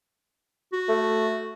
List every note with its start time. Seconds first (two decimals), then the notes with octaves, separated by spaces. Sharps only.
0.73 F#4
0.89 A3